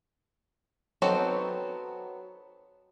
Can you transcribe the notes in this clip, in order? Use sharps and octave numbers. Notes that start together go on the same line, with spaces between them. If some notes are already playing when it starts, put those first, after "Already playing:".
F#3 B3 C4 D#4 A4